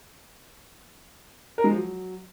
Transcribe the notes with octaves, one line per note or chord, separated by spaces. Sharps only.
A#4
G#3
F3
F#3